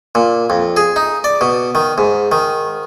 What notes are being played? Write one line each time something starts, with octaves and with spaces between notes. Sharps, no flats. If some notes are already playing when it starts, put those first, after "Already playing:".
A#2
F2
G#4
D#4
D5
B2
D#3
G#2
D#3